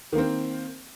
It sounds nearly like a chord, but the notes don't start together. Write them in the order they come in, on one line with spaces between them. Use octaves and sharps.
D#3 A#3 C4